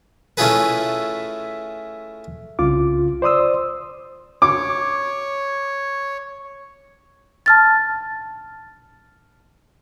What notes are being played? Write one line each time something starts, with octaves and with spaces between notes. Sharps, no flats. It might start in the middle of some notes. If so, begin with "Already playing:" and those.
A3 C#4 E4 F4 G#4 B4
C2 C#3 F4 D6
C5 D5 C6 D#6 E6
C#5 D6
A5 F6 A6